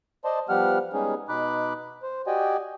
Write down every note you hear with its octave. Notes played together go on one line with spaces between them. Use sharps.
C5 D5 D#5 A5 C6
F3 G3 B3 G4 F#5 F6
G3 G#3 B3 C#4 D#4 G#4
B2 D#4 B5 D6 F#6
C5
F#4 G4 D5 D#5 G5 G#5